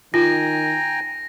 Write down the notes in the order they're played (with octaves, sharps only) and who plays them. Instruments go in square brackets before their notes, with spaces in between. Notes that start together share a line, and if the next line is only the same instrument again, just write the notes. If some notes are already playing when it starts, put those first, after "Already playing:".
[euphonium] D#3 [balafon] F4 [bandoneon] G5 G#5 A#5 [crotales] A#6